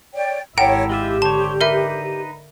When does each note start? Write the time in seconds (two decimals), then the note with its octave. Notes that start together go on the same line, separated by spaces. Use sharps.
0.15 C#5 D5 G5
0.58 G#1 E4 G4 A4 A#4 C#5 F#5 G5
0.89 G#3 F4 G4 E5
1.22 D3 C5 C#5 A5
1.61 D#4 A#4 B4 E5